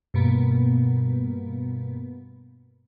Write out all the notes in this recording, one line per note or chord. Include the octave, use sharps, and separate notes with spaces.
G2 B2 A#3 B3